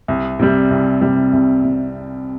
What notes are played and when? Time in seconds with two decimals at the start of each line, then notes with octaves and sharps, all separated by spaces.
0.08 C2
0.39 C3 G3
0.71 C2
1.01 C3 G3
1.33 C2
1.64 C3